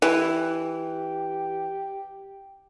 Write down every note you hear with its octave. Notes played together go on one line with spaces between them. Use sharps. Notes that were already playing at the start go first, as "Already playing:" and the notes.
E3 G4